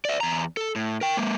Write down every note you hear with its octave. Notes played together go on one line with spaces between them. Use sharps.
D5 E5
E2 A#5
A4
A2
A#4 G5
G#3 A#3